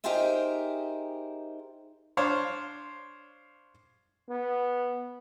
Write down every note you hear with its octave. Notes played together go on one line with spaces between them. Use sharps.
D#4 G4 G#4 A#4 C5 E5
D4 C5 C#5 F5
B3